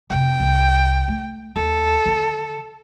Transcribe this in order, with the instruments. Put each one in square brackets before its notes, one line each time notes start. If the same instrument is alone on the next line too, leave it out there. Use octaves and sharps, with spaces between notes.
[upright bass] F1 C3 [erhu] G5
[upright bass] C2
A3
[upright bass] D#2 [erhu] A4
[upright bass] D3 D#3